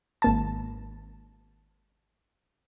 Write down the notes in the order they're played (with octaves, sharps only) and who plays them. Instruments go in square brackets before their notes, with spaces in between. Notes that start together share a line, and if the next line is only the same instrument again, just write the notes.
[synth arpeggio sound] G#1 A#3 A5